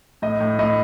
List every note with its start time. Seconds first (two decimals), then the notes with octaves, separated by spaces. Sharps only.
0.22 A2 D#5
0.40 A2
0.59 A2 D#5